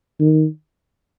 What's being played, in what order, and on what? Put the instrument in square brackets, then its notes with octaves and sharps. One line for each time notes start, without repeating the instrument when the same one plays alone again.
[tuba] D#3